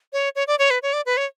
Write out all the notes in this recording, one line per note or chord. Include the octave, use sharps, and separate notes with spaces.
C#5
C#5
D5
C#5
B4
C#5
D5
B4
C#5